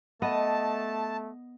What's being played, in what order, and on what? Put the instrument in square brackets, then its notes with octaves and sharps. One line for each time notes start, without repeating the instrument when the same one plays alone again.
[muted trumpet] A3 [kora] B3 [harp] D#5 [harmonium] A5